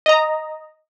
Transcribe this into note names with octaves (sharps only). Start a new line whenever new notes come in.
D#5 A#5